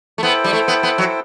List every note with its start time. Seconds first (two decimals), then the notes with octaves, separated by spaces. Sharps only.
0.18 A3
0.23 B3 E4 A4 C5 G5
0.44 G3
0.53 A3
0.68 B3
0.83 B3
0.98 F#3